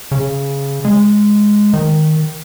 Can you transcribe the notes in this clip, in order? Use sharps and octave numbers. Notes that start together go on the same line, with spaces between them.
C#3
G#3
D#3